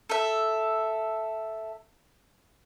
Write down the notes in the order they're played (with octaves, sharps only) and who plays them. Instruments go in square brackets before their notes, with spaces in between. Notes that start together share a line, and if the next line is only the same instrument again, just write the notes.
[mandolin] A4 E5